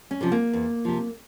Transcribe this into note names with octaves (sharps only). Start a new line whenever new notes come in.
C#4
C3 F3
A#3
E2
C3 F3